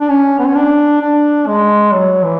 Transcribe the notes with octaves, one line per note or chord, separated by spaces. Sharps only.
D4
C#4
B3
C#4
D4
D4
G#3
F#3
E3